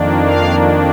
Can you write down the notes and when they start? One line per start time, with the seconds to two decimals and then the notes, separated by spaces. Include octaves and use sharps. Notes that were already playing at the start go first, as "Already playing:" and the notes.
Already playing: F2 D#3 A#3 D4
0.24 F5